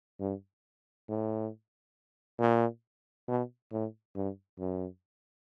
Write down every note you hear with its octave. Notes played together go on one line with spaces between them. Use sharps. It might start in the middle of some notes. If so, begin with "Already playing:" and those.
G2
A2
A#2
B2
A2
G2
F#2